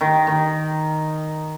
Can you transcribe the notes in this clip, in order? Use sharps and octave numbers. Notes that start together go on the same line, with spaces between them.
D#3
D#3